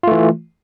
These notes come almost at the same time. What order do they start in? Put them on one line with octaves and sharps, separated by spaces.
F4 A3 E3